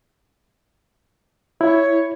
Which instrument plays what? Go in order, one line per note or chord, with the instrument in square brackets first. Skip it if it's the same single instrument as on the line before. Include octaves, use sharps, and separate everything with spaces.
[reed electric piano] E4 [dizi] C#5